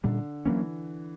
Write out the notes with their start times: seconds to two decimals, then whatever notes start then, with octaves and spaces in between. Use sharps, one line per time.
0.03 A#2 D3 G3 C#4
0.46 E3 F#3 A#3 C#4